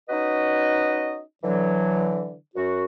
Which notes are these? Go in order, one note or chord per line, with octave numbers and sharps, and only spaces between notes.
C#4 D#4 F#4 B4 D#5
D3 E3 F#3
F#2 F#4